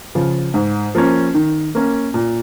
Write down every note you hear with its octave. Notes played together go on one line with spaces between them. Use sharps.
C#3 F3
G#2
F3 A#3 C#4
D#3
A#3 C#4
A#2